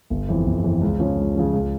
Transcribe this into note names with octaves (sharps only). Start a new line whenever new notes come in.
G1
F2 E3
G1
F2 E3
C#2
C#3 F3 C#4
C#2
C#3 F3 C#4
C#2